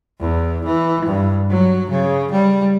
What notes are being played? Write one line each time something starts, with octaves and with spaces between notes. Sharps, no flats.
E2
E3
G2
F#3
C#3
G3